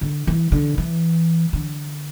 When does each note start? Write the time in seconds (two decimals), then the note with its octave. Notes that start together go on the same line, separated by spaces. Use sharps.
0.01 D3
0.27 E3
0.52 D3
0.78 E3
1.53 D3